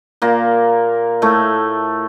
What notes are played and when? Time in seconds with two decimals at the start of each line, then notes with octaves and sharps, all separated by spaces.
0.22 A#2 A#3
1.22 A2 A3